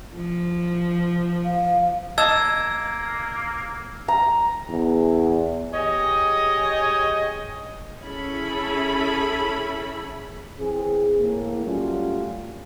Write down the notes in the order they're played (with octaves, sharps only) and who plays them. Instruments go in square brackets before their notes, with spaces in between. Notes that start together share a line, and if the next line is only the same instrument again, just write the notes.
[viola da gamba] F3
[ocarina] F5
[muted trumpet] A#3 [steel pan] D#5 A5 [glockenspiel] E6 G#6
[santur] A#5
[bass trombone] E2
[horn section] G4 G#4 C#5 D#5
[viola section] C#4 E4 G#4 A4 B5
[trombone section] E3 C4 G#4
A2 A#3
F#3 G3 A3 C#4 F4